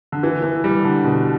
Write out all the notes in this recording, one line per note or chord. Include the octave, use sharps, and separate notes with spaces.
D3
E3
E3
G3
D3
B2